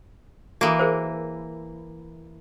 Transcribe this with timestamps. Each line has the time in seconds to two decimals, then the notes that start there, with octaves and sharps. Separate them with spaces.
0.61 E3 A#3 F#4 A4
0.79 G#4 A#4 C5